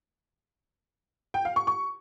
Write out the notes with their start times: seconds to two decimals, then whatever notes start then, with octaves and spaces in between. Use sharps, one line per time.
1.34 G5
1.45 F5
1.56 C#6
1.67 C#6